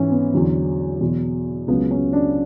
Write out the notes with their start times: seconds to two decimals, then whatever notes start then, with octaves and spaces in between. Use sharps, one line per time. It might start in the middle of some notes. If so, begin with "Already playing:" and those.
Already playing: G#2 E3 C#4 E4
0.11 B3
0.33 E2 D3 F#3
1.01 E2 B2 F#3
1.68 C#2 C#3 F#3 B3
1.91 C#4
2.13 D4